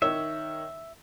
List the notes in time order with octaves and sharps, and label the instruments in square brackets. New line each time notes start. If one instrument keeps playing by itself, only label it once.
[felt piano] D#3 C#5 E6 [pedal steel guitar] E5